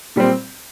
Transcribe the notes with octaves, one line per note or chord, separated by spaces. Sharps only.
A#2 G3 C4